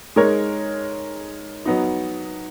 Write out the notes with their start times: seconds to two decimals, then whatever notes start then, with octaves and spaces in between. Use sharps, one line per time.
0.16 G#3 D#4 A#4 C#5
1.66 F#3 B3 D#4